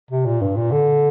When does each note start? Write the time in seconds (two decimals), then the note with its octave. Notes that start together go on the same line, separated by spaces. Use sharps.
0.11 C3
0.26 A#2
0.42 G2
0.57 A#2
0.72 D3